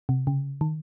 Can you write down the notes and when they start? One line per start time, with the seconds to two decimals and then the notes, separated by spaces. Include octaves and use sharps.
0.09 C3
0.27 C#3
0.61 D#3